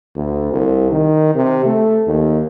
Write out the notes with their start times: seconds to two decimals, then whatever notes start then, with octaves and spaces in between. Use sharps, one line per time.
0.15 D2
0.51 C2
0.91 D#3
1.35 C3
1.65 A3
2.07 D#2